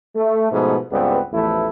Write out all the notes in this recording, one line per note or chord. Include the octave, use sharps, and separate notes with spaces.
A3
G#2 B2 F3 A3 B3
C#2 G2 G3 B3 C4
A1 E2 F3 A3 E4